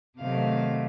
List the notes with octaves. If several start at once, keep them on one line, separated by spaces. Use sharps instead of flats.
C3 D#3 F#3 A3 F5